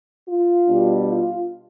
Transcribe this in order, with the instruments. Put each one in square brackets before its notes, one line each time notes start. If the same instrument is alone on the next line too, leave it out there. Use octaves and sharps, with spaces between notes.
[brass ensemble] F4
B2 G3 D4
F4